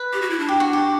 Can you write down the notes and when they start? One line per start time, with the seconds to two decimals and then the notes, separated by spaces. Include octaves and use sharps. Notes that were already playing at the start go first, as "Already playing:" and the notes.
Already playing: B4
0.13 G4
0.22 F#4
0.30 E4
0.39 D4
0.49 G4
0.60 F#4
0.73 G4